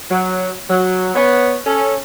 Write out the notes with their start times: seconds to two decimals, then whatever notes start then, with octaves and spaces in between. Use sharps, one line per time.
0.10 F#3
0.70 F#3
1.15 B3 C#5
1.66 C#4 A4